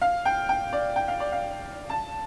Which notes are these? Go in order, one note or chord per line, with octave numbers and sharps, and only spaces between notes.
F5
G5
G5
D5
G5
F5
D5
F5
A5